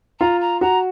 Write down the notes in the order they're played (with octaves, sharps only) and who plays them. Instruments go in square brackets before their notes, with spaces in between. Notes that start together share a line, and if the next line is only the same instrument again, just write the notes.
[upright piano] F4 [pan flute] A#5
[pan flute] A#5
[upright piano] F#4 [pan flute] A#5